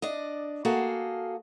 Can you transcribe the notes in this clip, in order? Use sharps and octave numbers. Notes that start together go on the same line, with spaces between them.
D4 D5 D#5
A#3 F#4 G#4 A4 F5